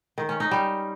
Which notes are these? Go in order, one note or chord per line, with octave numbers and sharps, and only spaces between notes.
D#3
C#4
D#4
G3